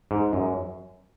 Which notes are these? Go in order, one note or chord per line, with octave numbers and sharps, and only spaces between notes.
G#2
F#2